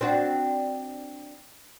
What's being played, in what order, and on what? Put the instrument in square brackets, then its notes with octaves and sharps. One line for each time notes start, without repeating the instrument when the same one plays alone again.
[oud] C4 D4 F#4